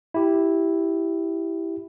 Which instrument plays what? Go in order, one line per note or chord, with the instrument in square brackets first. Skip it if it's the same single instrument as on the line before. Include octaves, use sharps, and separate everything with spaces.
[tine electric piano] E4 G4